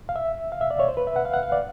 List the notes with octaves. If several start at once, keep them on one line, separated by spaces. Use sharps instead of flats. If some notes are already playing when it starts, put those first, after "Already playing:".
F5
E5
F5
E5
D5
C#5
C5
B4
E5
F#5
F5
F#5
F5
D5